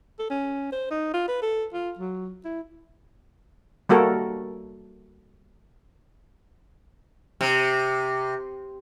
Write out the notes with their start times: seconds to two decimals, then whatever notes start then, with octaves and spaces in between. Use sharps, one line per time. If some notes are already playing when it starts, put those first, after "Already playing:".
0.19 A4
0.30 C#4
0.73 C5
0.91 D#4
1.14 F4
1.28 B4
1.42 A4
1.73 F4
1.99 F#3
2.45 E4
3.89 G3 A#3 F#4 A4 A#4
7.41 C3